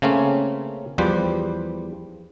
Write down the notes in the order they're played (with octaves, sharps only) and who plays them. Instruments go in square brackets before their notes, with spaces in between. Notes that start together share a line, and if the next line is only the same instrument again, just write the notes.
[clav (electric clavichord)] C#3 A3 A#3 C4 C#4
E2 F3 G3 B4 C5